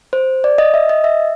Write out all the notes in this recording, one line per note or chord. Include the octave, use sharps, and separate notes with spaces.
C5
D5
D#5
E5
D#5
E5